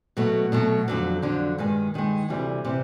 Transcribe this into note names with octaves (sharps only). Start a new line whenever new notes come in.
B2 F#3 A3
B2 F#3 A3
F2 D3 F#3
F2 D3 F#3
G2 D#3 G#3
G2 D#3 G#3
D2 C3 E3 G3
C3 E3 G3